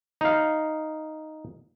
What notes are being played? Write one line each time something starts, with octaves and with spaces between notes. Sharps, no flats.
D#4 F5